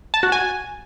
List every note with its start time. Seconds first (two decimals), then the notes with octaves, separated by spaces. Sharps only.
0.14 A5
0.23 F#4
0.32 G#5